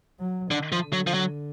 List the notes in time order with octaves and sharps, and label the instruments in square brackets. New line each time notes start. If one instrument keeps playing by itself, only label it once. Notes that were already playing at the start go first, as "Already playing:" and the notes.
[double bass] F#3
[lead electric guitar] D3 [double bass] D#3
[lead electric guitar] F3
[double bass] D3
[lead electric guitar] F#3
F3
F#3